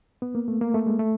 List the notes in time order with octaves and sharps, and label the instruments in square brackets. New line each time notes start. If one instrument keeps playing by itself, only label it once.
[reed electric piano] B3
A#3
A3
A#3
A3
G#3
A3